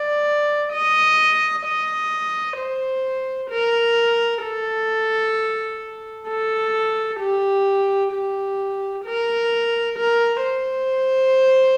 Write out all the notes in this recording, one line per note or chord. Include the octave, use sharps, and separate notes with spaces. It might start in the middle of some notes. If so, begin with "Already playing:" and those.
Already playing: D5
D#5
D#5
C5
A#4
A4
A4
G4
G4
A#4
A#4
C5